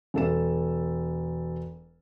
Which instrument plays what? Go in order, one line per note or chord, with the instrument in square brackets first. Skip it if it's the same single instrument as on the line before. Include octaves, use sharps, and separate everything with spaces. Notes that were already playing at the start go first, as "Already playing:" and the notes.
[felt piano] E1 A4 E7